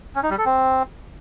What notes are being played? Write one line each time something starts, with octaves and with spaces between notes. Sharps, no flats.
C#4
D#4
G3
A4
C4